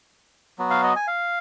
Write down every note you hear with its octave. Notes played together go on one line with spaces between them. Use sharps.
F#3 B3 F#4
F5
D#5
G#5
F5